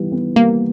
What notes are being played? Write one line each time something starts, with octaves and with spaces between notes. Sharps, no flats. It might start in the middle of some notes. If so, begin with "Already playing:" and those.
Already playing: E3 G3 B3
B3
G3 A#3